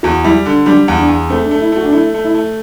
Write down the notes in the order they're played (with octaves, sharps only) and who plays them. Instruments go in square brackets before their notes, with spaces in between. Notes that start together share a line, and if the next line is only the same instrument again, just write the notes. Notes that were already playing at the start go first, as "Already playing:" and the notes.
[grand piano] E2 [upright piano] F#4
[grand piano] G3 [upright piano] E4
[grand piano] D3 [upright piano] D4
[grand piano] G3 [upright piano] D4
[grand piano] E2
[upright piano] D4
[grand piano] E2
[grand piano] A3 [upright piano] C4
[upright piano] D4
[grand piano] A3
[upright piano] E4
[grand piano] A3 [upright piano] F#4
[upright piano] D4
[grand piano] A3 [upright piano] E4
[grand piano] A3
[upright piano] E4
[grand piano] A3